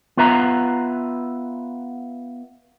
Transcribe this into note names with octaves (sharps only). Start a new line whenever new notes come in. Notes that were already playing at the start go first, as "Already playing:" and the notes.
B3 F4 B4 E5 A#5